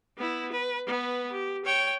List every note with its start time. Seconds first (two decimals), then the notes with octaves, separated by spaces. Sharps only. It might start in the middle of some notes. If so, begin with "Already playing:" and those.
0.18 B3 E4
0.52 B4
0.87 B3 B4
1.32 G4
1.65 C#5 G5